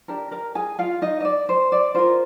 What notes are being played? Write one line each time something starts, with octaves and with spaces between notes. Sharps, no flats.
D4 G4 A#4
A#4 A#5
G#4 G#5
F4 F5
D#4 D#5
D#5
D5
C5
D5
F4 A#4 C5